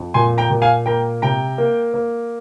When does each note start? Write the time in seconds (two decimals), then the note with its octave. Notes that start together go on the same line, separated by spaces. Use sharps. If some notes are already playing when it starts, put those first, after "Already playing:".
Already playing: F2
0.14 A#2 G#5 C6
0.38 G5 A#5
0.50 A#2
0.62 F5 G#5
0.86 A#3 G5 A#5
1.22 C3 G5 A#5
1.58 A#3
1.94 A#3